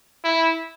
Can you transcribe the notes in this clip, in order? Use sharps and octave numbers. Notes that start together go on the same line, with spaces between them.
E4